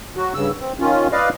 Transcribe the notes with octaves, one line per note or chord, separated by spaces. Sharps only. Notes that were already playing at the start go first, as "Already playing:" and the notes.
F#3 F#4
G2 C#3 E6
C4
D#3 C#4 F4
B4 D5 D#5 F5